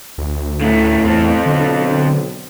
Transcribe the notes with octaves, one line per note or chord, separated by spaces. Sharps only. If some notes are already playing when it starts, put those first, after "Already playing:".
D2
A2 C#3 A3
E2 C4 A4
B1 D3